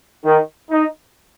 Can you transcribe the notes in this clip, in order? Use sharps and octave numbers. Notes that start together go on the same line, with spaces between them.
D#3
D#4